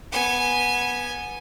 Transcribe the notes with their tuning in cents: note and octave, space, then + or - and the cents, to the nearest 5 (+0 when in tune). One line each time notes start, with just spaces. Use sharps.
B3 -10 G#5 +0